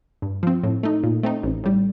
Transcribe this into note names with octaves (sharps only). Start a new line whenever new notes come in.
G2
F3 C4
A2
A3 D#4
A#2
A3 C4 D#4
A1
A2 G3